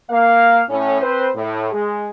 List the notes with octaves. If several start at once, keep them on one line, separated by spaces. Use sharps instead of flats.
A#3 F5
A2 C#4
C4 B4 C5
A2
G#3 G#4